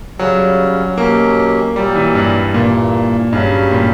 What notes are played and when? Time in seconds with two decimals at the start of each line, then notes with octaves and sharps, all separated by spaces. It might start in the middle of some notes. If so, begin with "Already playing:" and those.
0.19 C#3 F#3 G3 C#4
0.98 B2 F#3 A#3 C#4 G4
1.76 A#2 F#3 G3 A#3
1.95 E3
2.15 G2
2.54 G2 A#2 E3 A#3
3.32 G2 C#3 F#3 C#4 G4
3.71 A#2